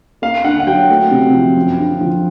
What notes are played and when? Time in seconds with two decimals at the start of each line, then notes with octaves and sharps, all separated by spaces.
0.22 A#3 F5
0.44 D3 F#5
0.60 F#5
0.67 F#3 G5
0.89 A3
1.11 C3
1.34 F3
1.56 F#2
1.79 D3
2.01 F3